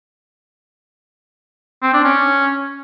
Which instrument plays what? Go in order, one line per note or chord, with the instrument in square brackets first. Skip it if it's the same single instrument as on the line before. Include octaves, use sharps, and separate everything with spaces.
[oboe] C4
D4
C#4